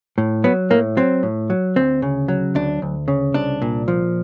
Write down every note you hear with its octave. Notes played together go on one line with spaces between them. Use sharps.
A2
F#3 B3
A2 A#3
F#3 C4
A2
F#3
D2 C4
C#3
F#3
D2 D4
D2
C#3
C2 D4
A#2
F3